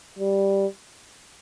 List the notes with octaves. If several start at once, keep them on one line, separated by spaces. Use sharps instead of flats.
G3